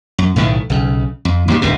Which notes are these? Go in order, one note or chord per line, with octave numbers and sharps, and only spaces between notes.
F#2
B1 A2 D#3 A3
B1 C#3
F2
D#2 A2 F3 G3
D1 D2 G#2 B2